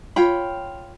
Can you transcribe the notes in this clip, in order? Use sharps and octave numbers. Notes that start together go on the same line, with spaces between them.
F4 C#5 G5 B5